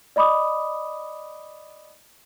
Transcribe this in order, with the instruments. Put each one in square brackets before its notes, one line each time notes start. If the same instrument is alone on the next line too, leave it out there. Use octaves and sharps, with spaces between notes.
[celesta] D5 D#5 B5 D6 D#6